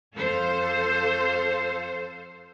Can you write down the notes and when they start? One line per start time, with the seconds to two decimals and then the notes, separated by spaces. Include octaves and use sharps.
0.15 F2 A4 C5 F5